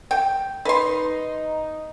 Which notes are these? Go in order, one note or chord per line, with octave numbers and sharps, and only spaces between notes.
G5
D#4 B4 C6